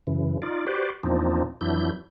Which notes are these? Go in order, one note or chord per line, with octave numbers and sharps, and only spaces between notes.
F#2 C#3 E3
D#4 F4 D5
F#4 G4 B4 C5 D5
E2 A#2 F3 C4 D4 D#4
F2 E3 F#3 D4 E4 G6